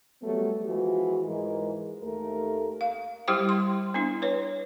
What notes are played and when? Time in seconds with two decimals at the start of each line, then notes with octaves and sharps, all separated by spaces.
0.22 F#3 G3 A3 B3
0.66 E3 F3 G#3 F#4
1.25 G#2 E3 G#3 A#4
2.03 D#2 A3 A#4
2.81 F5
3.28 G3 E4 G4 C5 G5 D6
3.49 C6
3.94 B3 D4 E4
4.22 B4 C#5